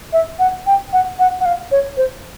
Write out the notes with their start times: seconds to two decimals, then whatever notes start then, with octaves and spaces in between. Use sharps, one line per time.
0.13 E5
0.39 F#5
0.67 G5
0.93 F#5
1.19 F#5
1.40 F#5
1.45 F5
1.71 C#5
1.97 C5